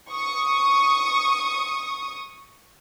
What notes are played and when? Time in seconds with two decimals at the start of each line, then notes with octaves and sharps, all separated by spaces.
0.11 C#6 D#6